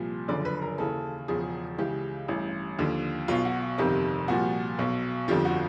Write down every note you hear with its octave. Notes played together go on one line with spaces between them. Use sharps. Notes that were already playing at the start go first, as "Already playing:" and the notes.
Already playing: C2 A#2 F3
F#1 F#2 D3 F3 D5
B4
A#4
D#2 C#3 E3 A4
E1 E2 C#3 F3 G#4
C#2 C#3 E3 G4
A1 G2 E3
D#2 D3 F3
B1 B2 F4
F#4
G1 F2 C3 D#3 G4
C2 A#2 F3 F#4
B1 B2
G1 F2 D3 F3 G4
F#4